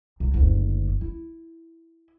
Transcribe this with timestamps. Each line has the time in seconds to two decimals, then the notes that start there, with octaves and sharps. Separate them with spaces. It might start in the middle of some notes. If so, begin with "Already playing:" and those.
0.20 C2
0.34 F#1 D2
1.01 E4